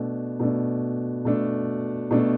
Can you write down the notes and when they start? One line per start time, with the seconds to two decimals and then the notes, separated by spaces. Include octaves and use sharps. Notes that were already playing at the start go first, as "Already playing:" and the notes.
Already playing: B2 A3 D4
0.40 B2 A3 D4
1.25 B2 A3 D4
2.11 B2 A3 D4